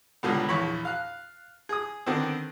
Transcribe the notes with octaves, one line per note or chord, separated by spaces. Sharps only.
C#2 A#2 D3 G3 B3
A#1 E2 C#5 B5
F5 F#6
G#4 D#6
D3 D#3 B3 C4